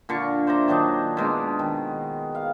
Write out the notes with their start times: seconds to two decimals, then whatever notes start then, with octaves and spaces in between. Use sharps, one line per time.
0.09 A#2 D3 C#6
0.47 C5 D5 E5 A#5
0.68 D#3 F#3 D4 D#4
1.17 B2 G#3 D4
1.59 D#3
2.35 F5